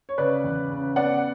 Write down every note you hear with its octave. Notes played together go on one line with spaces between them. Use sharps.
C#5
C#3 B4 D5
E2
C#3
B3 D5 F#5